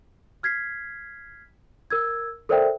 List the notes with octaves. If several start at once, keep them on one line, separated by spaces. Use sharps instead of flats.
F6 G#6 B6 C7
A#4 E6 G#6
A4 A#4 C5 D5 E5 G5